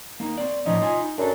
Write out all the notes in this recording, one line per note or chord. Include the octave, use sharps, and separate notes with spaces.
A#3 D#4
C4 D5
A2 F3 C#4 D#4
F4 G#5
D#4
F#2 D4 A4